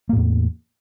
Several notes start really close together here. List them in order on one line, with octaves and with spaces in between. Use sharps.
A#3 A2 E2